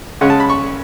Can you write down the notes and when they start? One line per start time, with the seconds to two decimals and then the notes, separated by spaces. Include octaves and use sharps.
0.21 C#3 G#3 C#4 F#5
0.30 A5
0.40 B5
0.50 C#6